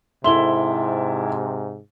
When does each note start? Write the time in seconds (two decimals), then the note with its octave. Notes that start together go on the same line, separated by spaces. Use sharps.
0.24 G#2 C3 E4 A4 E5 C6 G7